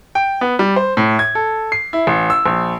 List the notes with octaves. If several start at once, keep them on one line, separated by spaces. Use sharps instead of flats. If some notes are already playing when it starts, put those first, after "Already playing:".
G5
B3
G3
C5
A2
G#6
A4
C7
E4
A1
E6
A#1